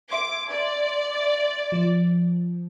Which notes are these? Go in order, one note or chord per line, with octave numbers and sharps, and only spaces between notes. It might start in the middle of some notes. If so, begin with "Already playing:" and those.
E5 C6 D6 G#6
D5
F3